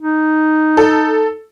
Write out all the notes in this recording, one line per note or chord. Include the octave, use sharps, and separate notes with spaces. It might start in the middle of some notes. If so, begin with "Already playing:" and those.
D#4
A4